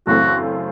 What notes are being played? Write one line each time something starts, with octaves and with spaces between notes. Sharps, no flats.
F#2 C#3 E3 A3 C4 F#4